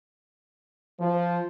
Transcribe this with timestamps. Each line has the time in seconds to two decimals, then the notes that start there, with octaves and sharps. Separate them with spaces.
1.00 F3